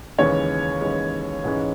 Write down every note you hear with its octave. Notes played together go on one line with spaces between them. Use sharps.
D#2 C#3 E3 G#3 C#4 C#5
D#2 C#3 E3 G#3
G#2 E3 G#3 C#4